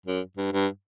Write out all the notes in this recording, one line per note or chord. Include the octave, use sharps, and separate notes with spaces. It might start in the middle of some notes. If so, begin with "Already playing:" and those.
F#2
G2
G2